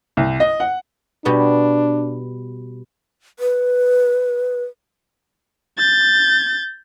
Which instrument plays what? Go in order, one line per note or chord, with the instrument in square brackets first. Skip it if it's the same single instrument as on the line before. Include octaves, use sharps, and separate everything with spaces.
[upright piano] C2
D#5
F#5
[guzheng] B2 G3 B3 [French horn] D4
[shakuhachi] B4
[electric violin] G6 A6